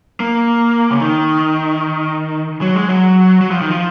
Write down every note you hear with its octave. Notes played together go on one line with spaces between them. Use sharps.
A#3
C#3
D#3
F#3
G#3
F#3
F#3
F3
D#3
F3